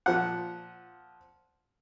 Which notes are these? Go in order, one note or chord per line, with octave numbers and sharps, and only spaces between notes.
A#2 F3 F#5